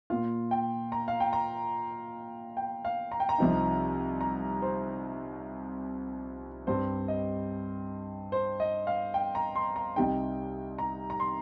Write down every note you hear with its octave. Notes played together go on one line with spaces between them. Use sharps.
A#2 A#3 F4 F5
G5
A#5
F5
G5
A#5
G5
F5
A#5
G5
A#5
C2 C3 F3 D#4
A#5
C5
G2 G3 C4 C5
D#5
C5
D#5
F5
G5
A#5
C6
A#5
C2 C3 G3 D#4 G5
A#5
A#5
C6